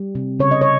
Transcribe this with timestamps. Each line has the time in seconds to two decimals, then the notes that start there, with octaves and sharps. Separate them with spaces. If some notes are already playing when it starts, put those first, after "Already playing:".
Already playing: G3
0.15 C3
0.40 C#3 C#5
0.51 D#5
0.61 C#5